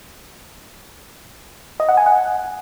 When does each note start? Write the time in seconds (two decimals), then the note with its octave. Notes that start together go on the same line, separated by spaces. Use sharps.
1.80 D#5
1.89 F#5
1.97 G#5
2.06 F#5